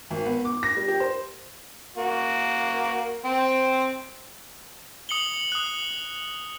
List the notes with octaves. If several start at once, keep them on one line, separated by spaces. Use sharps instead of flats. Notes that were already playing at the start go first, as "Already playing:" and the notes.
G#1
B3
D6
A#6
G3
G4
C5
A#3 F#4
C4 C5
D#6 C#7 F#7 G7
D#6 F#6